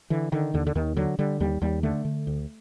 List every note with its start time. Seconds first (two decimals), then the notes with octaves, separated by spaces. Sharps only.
0.10 D3 E3
0.32 D3 D#3
0.54 D#2 D3
0.67 D3
0.75 D#2 D#3
0.96 D3 F#3
1.19 D3 G3
1.40 D#2 G3
1.61 D#2 G3
1.83 D3 A3
2.05 D3
2.27 D2